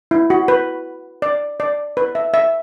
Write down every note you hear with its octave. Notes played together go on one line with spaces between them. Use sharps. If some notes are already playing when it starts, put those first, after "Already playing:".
E4
F#4
B4
D5
D5
B4
E5
E5